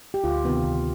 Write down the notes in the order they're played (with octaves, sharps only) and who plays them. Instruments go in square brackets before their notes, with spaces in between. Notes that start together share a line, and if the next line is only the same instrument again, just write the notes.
[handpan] G4
[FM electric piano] D2 [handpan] F4
[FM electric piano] C3 D#3 B3
D2